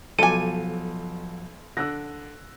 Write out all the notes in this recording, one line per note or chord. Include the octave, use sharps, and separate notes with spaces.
B1 F3 F#3 A4 G#5 D6 D#7
D3 E6 F#6 A#6